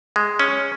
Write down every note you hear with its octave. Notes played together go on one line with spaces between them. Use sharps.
G#3
C#4